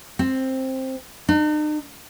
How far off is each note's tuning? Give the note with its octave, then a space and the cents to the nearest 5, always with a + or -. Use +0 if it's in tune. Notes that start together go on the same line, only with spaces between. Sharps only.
C4 +10
D#4 -45